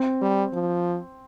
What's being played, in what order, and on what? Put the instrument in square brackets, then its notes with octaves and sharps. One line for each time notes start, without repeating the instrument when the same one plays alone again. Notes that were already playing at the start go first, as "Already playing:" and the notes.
Already playing: [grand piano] C4
[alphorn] G3
F3